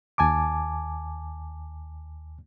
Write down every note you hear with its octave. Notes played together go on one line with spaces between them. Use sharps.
D#2 G#5 A5 D6